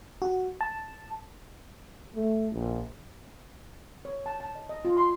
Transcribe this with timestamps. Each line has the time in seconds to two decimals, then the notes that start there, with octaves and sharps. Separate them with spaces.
0.22 F#4
0.61 A5
2.14 A3
2.51 A#1
4.05 C#5
4.26 A5
4.40 A5
4.55 D#5
4.69 D#5
4.85 F4
4.97 C6